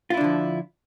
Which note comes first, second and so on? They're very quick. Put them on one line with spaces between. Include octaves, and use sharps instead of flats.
F4 E4 D4 D3 F3